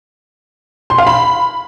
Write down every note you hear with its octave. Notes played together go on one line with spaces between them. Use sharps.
C6
F5
B5